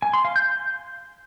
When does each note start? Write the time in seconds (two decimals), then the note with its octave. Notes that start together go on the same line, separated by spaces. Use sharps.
0.02 G#5
0.14 C6
0.25 F5
0.36 G6